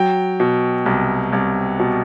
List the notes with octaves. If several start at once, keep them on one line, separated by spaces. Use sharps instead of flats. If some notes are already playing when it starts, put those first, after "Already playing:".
Already playing: F#3 G5
B2
C2
C2
B2